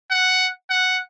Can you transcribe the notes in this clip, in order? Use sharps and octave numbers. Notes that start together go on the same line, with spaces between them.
F#5
F#5